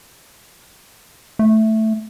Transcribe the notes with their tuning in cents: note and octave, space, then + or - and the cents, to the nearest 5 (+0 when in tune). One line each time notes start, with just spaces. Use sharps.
A3 +0